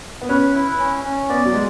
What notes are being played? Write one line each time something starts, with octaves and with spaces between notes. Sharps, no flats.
B3
C#4 B4
E4
C#4
C#4
B3 D5
F#3
G#3